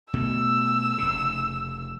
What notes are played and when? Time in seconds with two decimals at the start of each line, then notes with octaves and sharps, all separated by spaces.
0.13 B2 A3 E6
0.98 F1 C#3